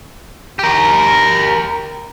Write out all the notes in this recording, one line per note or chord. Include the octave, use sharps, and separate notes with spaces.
G4 A#4